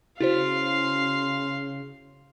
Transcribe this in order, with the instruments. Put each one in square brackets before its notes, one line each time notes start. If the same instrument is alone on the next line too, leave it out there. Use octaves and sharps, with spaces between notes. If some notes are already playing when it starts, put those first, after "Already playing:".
[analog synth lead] C#3 [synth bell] E4 F#4 C5 [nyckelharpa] F5 C6